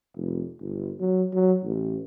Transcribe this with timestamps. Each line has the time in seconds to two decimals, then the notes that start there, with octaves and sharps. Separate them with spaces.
0.15 F1
0.60 G1
0.99 F#3
1.33 F#3
1.64 A1